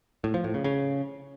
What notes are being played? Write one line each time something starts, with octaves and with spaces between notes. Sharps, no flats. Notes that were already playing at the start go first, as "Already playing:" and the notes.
A2
F3
A2
C#3
C#3